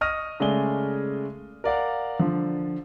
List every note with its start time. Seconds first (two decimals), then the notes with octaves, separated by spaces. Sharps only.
0.01 D#5 C#6 D#6 F6 A#6 D#7
0.40 C#3 G#3 A3 D5 G#5 G7
1.64 A#4 D5 F5 F#5
2.20 D3 F3